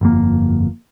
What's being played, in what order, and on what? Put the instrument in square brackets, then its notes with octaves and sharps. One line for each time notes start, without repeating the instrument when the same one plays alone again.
[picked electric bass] G1 F2 A#3